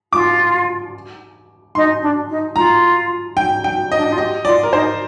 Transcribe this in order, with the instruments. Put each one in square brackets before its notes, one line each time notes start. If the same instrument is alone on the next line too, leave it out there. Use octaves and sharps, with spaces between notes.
[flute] F4 [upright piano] D6
[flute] D#4 [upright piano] C6
[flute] D4
D#4
[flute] F4 [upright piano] A#5
[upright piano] G5
G5
D#5
[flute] D4
D#4
F4
[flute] G4 [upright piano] D#5
[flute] F4 [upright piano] D5
[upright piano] A#4
[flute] D#4 [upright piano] C5